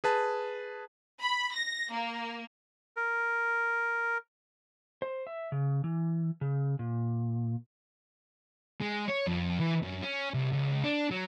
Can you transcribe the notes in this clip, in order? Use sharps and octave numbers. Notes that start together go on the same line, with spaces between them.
G#4 B4 A5
B5
A#6
A#3
A#4
C5
E5
C#3
E3
C#3
A#2
G#3
C#5
F2
E3
F#2
C#4
C2
C#2
D4
F#3